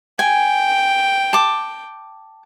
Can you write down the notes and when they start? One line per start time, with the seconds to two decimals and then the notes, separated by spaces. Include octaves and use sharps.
0.19 G5 G#5
1.33 A5 D6